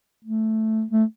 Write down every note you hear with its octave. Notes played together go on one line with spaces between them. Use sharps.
A3
A3